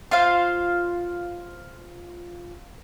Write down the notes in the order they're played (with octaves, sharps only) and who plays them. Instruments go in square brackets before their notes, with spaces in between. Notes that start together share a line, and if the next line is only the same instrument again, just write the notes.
[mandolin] F4 C5 F5